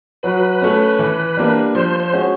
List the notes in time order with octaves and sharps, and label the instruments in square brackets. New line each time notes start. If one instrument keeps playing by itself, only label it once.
[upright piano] F#3 [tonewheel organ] B4
[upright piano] A3 C#4
E3
G3 A#3 D4
[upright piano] F3 [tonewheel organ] C5
[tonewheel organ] C5
[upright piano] G#3 C#4 F#4